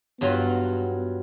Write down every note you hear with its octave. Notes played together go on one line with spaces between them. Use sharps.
G2 F#3 B3 F4